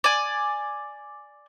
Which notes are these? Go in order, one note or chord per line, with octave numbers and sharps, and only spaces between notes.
D5 G#5